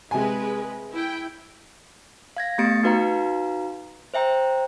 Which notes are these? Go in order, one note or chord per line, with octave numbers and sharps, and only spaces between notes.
C3 G#3 B4 G#5
E4 G5
F5 G#6 A#6
A3 B3 G4 A6 C#7 D7
D#4 F#4 B4 F5 A#5
C5 E5 G5 A#5